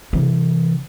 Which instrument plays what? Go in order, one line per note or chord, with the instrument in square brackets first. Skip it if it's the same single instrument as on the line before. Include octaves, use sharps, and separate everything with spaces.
[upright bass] C3 E3